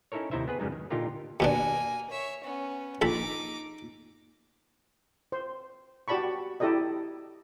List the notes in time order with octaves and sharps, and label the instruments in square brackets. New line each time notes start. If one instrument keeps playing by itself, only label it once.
[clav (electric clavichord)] C#4 D#4 E4 A4 A#4 C#5
D#2 C3 D#4 E4 C5 E5
B3 G#4 B4
F#2 C#3 G3 G#3 D#4
D#3
A#2 D3 D#4 F4 G4 A#4
[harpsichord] D#2 B2 D4 [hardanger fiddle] A#3 G#5
[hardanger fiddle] C#5 E5
B3 C#4
[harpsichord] A#1 A4 B5 [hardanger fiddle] D#4 D6
[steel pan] C5
F#4 G4 D5 A5 B5 C#6
E4 G4 A4 D5 D#5